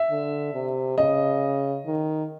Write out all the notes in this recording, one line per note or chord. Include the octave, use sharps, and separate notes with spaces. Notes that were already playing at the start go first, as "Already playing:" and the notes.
Already playing: E5
D3
C3
C#3 D#5
D#3